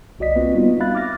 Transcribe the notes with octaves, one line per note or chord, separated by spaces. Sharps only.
G1 C2 F#4 D5 D#5 B6
A#3 C4 F4 F#4 B4 D#5
G3 B3 D#4 F4 F#4
E5 F5 B5 F#6 A6
D6 F6 A6 A#6